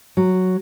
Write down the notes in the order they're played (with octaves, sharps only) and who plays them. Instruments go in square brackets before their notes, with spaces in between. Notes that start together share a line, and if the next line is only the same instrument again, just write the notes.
[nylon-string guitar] F#3